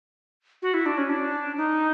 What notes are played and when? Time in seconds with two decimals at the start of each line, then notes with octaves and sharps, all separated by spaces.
0.62 F#4
0.74 E4
0.86 D4
0.98 C#4
1.09 D4
1.57 D#4